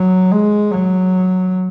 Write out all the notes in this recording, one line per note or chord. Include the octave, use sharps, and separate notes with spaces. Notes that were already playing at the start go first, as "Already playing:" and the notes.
Already playing: F#3
G#3
F#3